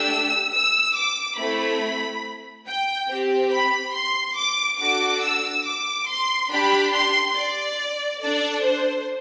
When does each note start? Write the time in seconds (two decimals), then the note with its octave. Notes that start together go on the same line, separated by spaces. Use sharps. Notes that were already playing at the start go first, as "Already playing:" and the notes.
Already playing: A3 D4 G4 E6
0.53 E6
0.96 D6
1.38 A3 C4 E4 B5
2.67 G5
3.09 C4 G4
3.52 B5
3.95 C6
4.37 D6
4.80 D4 F#4 A4 D6
5.23 E6
5.65 D6
6.08 C6
6.51 D4 G4 B5
6.93 C6
7.36 D5
8.22 D4 A4 D5
8.64 C5